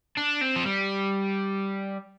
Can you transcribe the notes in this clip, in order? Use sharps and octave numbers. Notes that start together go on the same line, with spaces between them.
D4
C4
F3
G3